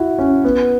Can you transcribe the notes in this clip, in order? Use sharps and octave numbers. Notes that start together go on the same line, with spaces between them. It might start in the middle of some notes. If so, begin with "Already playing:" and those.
Already playing: E4 F#4
C#4
B3